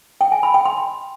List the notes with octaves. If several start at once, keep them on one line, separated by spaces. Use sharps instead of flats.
G5
G#5
B5
G5
C6